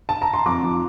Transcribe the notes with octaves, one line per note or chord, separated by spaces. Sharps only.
A5
A#5
C6
F2 A#5 D6
F3